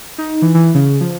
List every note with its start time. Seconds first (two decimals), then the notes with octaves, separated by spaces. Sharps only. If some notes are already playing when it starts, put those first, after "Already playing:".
0.18 D#4
0.42 E3
0.55 E3
0.75 C#3
1.01 F3